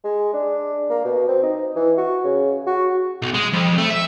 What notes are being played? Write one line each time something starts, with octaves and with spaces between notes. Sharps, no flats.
G#3
D4
A#3
B2
C4
D#4
E3
F#4
C#3
F#4
B1
G#3
F2
A3
E5